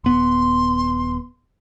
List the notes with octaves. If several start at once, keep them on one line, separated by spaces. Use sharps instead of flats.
D#1 B3 C6